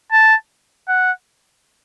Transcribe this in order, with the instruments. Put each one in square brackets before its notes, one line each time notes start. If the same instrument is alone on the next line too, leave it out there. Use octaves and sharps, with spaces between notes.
[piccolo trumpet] A5
F#5